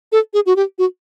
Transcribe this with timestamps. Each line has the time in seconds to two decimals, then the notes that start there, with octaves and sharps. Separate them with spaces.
0.12 A4
0.34 G#4
0.46 F#4
0.56 G4
0.78 F#4